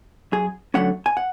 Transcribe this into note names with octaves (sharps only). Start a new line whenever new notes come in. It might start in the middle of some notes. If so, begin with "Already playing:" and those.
F#2 G#4
D3 F#3 A3 C#4 F#5
G#5
F#5